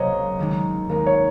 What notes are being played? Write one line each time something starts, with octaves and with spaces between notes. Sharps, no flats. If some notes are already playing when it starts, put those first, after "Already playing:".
Already playing: C#2 C3 F#3 A#3 C#5 D#5
D#2 D#3 G#3 D#4
D#2 D#3 G#3 D#4 A#4
C#5